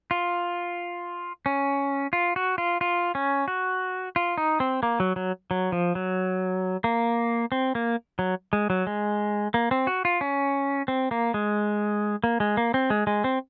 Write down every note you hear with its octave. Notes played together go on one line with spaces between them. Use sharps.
F4
C#4
F4
F#4
F4
F4
C#4
F#4
F4
D#4
C4
A#3
F#3
F#3
F#3
F3
F#3
A#3
C4
A#3
F#3
G#3
F#3
G#3
A#3
C4
F#4
F4
C#4
C4
A#3
G#3
A#3
G#3
A#3
C4
G#3
G#3
C4